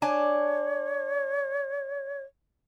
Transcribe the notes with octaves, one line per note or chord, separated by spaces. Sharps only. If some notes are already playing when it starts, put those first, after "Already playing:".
D4 C#5 G#5